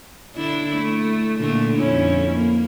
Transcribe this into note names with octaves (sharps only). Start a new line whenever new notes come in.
D3 D4 E4
A3
A#2 D3 A3
F2 C#4 E4
A#3